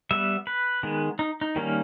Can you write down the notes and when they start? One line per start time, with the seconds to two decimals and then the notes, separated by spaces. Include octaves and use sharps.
0.11 G3 B3 E5
0.47 B4
0.83 D#3 G#3 B3
1.19 D#4
1.41 D#4
1.56 D#3 G3 A#3 C#4